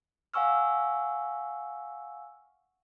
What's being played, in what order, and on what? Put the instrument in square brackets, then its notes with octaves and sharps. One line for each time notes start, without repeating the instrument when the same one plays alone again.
[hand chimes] F5 F#5 G#5 C#6 E6 F6